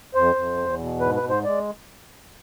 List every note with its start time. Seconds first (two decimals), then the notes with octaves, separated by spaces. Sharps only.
0.15 F2 C5
0.36 F2
0.58 E2
0.79 B2
1.01 G#2 B4
1.15 B4
1.23 G#2
1.29 C5
1.44 G#3 D5